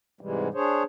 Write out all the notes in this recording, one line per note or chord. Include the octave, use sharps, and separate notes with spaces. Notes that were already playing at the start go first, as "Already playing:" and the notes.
G#2 C3 E3 G3 G#3
D4 G#4 C5 C#5